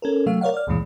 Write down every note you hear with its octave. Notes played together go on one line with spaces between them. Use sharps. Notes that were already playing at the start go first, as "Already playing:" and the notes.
C#4 A4 A#4
C3 F#3 A3 F5
A#4 C#5 D5 F5 F#5
D5 F6
C#2 F#2 A#2 E3 G#3